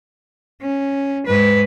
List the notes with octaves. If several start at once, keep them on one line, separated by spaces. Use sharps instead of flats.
C#4
G#2 B4